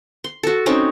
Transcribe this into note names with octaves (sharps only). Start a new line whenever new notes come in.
C6
F#4 A4
C4 C#4 D#4 F#4